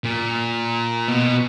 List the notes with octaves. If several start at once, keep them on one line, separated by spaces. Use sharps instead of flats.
A#2
B2